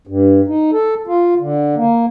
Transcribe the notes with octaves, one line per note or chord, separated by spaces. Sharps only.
G2
D#4
A4
F4
D3
A#3